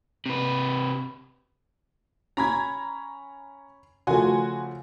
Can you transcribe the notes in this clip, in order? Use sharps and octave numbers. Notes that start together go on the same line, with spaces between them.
C3 B4
C#4 A#5 B5 G#6
C#3 F3 A3 F#4 G#5 C6